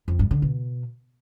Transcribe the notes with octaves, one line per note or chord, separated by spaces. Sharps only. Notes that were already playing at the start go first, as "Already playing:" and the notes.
F2
G2
D3
B2